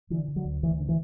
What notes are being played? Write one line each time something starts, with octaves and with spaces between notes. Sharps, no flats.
D3 E3
D3
F#3
D2
D2 E3
D3
E3